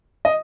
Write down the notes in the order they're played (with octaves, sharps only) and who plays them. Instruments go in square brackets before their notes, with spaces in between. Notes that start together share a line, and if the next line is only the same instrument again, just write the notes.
[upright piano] D#5